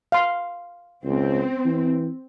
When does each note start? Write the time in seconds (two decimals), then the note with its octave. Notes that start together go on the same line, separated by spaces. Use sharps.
0.12 F5 C6
1.05 C#2 C4
1.65 E3